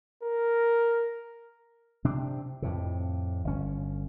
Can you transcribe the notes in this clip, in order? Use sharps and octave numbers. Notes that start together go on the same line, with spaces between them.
A#4
C3 C4 D4
F2 A2 C3
G1 C#4